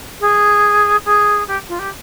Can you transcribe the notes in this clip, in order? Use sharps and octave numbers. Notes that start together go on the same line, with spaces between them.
G#4
G#4
G4
F4
G4